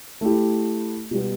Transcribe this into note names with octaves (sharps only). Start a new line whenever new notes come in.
A3 E4 G4
B2 G3 B3